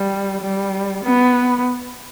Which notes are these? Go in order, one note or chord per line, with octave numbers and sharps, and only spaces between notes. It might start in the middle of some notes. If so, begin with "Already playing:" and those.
Already playing: G3
G3
B3